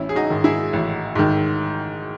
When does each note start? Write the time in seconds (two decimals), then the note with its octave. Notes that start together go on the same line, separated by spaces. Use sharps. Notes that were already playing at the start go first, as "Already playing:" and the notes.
Already playing: A1 C#4 E4
0.09 G#4
0.16 D#4 F#4
0.30 G#2 D#3
0.44 E4 G#4
0.73 A1
1.15 G#2 D#3